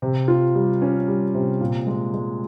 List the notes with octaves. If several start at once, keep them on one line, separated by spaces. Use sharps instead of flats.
C3
F4
G3
C#4
G3
C3
A#2
G#3
G#3